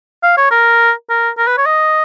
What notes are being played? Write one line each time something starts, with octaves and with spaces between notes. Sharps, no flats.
F5
C#5
A#4
A#4
A#4
B4
C#5
D#5